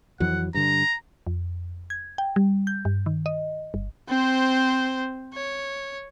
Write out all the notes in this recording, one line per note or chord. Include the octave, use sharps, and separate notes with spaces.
F2 E3 F#3 F#5
G2 D3 A#5
F2
G#6
G5
G3
G6
G2
D#3
D#5
G1
C4 C5
C#5